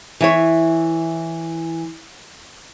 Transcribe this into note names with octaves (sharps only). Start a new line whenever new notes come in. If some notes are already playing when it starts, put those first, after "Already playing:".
E3 E4 C#5